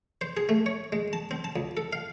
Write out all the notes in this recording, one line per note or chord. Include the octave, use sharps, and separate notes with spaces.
C5
G#4
A3
C#5
G#3
A5
C4
A5
C#2
A4
F5